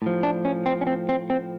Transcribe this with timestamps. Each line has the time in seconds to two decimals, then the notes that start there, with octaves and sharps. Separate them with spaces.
0.02 A2 F3
0.23 D4
0.45 C#4
0.66 C4
0.81 C#4
0.87 C4
1.09 C4
1.30 C4